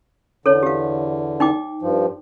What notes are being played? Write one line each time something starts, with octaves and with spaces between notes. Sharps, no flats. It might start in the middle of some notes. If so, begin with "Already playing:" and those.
E2 D3 A4 C#5
G4 F5
D#4 G5 D6
G2 F3